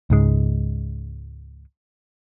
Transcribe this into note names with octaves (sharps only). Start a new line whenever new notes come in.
C#2 G#2 G#3